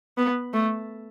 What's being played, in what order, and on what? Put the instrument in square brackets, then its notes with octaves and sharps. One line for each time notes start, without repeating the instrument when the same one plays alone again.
[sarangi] B3
A3